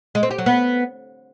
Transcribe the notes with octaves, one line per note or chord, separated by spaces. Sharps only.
G#3
C4
G4
F#3
B3